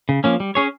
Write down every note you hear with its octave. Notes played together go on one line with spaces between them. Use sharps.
C#3
F3 A#3 C#4
G3
C#4 G#4 C#5